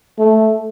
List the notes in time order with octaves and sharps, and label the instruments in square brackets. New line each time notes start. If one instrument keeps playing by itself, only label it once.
[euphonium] A3